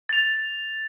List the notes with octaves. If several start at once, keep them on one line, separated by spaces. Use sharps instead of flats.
A6 F7